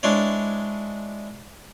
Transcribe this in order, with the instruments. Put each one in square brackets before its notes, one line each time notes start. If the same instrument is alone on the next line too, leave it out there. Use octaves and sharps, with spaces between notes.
[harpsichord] G#3 D4 E4 C5 C#5